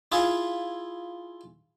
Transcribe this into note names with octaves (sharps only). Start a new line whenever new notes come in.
E4 F4 G#4